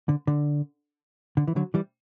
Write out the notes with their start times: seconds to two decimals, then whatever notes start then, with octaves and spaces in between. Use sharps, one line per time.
0.09 D3
0.27 D3
1.37 D3
1.48 E3
1.56 D3 F#3
1.74 E3 G3